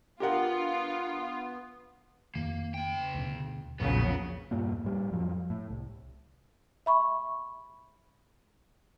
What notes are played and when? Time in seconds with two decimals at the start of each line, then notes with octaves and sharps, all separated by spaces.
0.20 B3 D4 F4 G4 A#4 F#5
2.35 F2 D#3 A#3
2.74 C#3 G5
3.15 D2 B2
3.80 A#1 E2 C#3 F#3 B3
4.51 E2 G2 A#2 A#3
4.85 A2 G3
5.11 F2 F3 F#3
5.32 F2
5.50 A2
5.70 C2
6.86 E5 B5 C#6